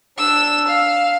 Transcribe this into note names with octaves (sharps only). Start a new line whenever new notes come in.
D4 E6
F5